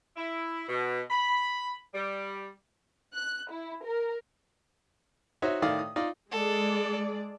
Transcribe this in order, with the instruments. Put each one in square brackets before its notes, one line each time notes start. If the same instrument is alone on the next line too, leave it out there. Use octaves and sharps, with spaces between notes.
[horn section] E4
B2
B5
G3
[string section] F#6
E4
A#4
[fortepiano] D#4 F#4 C5 C#5 E5
A2 D#3 D5 F5 D#6
D#6
D#4 F4 D5
[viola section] G#3 G#4 D5 [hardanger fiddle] A4